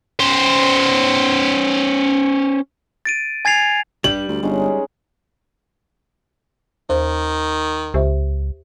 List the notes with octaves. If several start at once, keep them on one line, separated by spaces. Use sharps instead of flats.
C#4 C5
A6 D7 D#7
G#5 G#6 A6 C7 F7
G2 G3 F#7
D2
G1 G#3 C#4 D#4
D#2 D#3 C5
C#2 G4 C5 E5